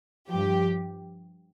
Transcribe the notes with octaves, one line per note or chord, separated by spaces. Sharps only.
G2 F3 G4